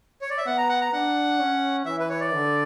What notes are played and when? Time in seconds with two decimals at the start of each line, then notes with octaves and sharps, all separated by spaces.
0.21 C#5
0.30 D5
0.38 E5
0.46 B3 F#5
0.58 A#5
0.69 F#5
0.81 A#5
0.93 D4 F#5
1.39 C#4
1.86 E3 E5
2.00 B4
2.09 C#5
2.20 D5
2.32 D3